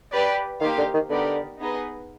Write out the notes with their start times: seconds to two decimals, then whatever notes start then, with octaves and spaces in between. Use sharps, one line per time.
0.12 G4 B4 D5
0.61 D#3 A#3 D#4 G4 C5 F5
0.78 D3
0.94 D#3
1.10 D3 B3 D#4 G4 A#4 D5
1.59 B3 D#4 G#4 B4 D#5